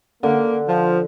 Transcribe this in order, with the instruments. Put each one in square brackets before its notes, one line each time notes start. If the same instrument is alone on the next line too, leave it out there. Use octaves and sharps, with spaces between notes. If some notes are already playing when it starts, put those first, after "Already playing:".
[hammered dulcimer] D3 [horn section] A#3
[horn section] F3